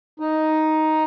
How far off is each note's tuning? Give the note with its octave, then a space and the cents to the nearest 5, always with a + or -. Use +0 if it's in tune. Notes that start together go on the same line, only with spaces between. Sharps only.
D#4 +5